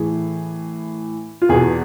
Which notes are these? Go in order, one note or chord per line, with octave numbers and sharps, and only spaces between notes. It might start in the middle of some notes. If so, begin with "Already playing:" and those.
Already playing: A2 E3 G#4
F4
E2 B2 G#4